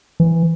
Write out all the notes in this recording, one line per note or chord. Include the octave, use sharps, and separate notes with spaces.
E3